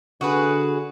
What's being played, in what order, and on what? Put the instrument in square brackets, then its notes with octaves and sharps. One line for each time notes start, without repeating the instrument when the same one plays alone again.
[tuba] D3 [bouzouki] F#4 G#4 B4